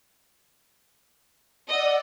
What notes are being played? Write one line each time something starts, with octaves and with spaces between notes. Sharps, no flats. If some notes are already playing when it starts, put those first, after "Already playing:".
D5 D#5 F#5 E6